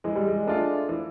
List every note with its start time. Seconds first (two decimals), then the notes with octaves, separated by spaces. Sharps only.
0.04 E3 G#3
0.16 G3
0.28 G#3
0.47 A3 D4 F4
0.89 E3